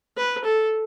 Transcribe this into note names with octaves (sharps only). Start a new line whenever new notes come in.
B4
A4